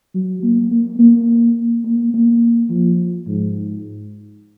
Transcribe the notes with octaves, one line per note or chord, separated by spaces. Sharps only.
F#3
A#3
A#3
A#3
A#3
A#3
F3
G#2